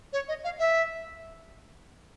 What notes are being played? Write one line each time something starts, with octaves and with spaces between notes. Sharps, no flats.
C#5
D#5
F5
E5